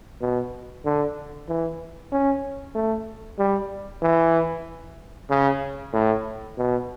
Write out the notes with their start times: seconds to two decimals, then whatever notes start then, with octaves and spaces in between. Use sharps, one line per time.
0.21 B2
0.85 D3
1.48 E3
2.12 C#4
2.75 A3
3.39 G3
4.03 E3
5.30 C#3
5.93 A2
6.57 B2